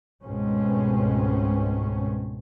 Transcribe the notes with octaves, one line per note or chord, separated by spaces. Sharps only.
C#2 G#2 B2 A3 C4 C#4